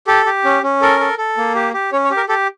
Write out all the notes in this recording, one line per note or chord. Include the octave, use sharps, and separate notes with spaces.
G4 A4
G4
C#4
C#4
A4 A#4
A4
A4
A#3
G4
G4
C#4 C#5
C#5
G4
A#4
G4 A4